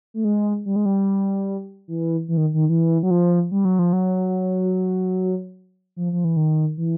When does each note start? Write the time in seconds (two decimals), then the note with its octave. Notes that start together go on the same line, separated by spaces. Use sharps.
0.14 A3
0.25 G#3
0.66 G3
0.76 G#3
0.86 G3
1.88 E3
2.28 E3
2.37 D#3
2.54 D#3
2.69 E3
3.03 F#3
3.11 F3
3.51 G3
3.65 F#3
3.79 F3
3.93 F#3
5.97 F3
6.13 F3
6.25 E3
6.37 D#3
6.78 E3